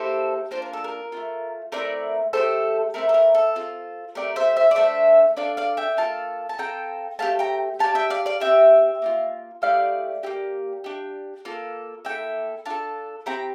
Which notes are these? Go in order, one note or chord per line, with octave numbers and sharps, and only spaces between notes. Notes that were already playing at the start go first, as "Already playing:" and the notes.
Already playing: A#3 E4 G4 A4 C5
A#3 D4 F4 C5
A#4
A4
A#4
A3 D4 F4
A3 C4 E4 A#4 D5
A3 E4 G4 A4 C5
A3 C4 E4 A#4
A4
A#4
A4
C4 F4 A4
A3 C4 G4 A#4 D5
C5 E5
C5 E5
D5
A3 D4 A4 C5 E5
D4 A4 D5 F5
D5 F5
E5 G5
A#3 F4 A4 F5 A5
A5
C4 F4 A4 G5 A#5
A3 C4 G4 F5 A5
G5 A#5
D4 G4 F5 A5
E5 G5
D5 F5
D5 F5
C4 E4 G4 E5 G5
A#3 D4 F4
A3 E4 G4 D5 F5
A#3 E4 G4
D4 G4
A#3 F4 A4
A#3 E4 A4 E5 G5
D4 F4 A4 F5 A5
C4 E4 G4 G5 A#5